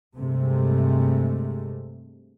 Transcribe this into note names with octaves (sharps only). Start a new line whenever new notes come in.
G2 C3 G#3 A3